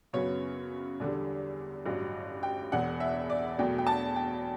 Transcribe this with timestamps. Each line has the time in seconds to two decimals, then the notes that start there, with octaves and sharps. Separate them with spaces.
0.13 F#2 C#3 F#3 B3 C#5
1.00 E2 D3 G3
1.86 A1 G2 F#3
2.43 G5
2.72 E1 E2 B2 F#5
3.00 E5
3.30 D5
3.58 E2 B2 F#3 A3 G5
3.78 G5
3.87 A5
4.16 G5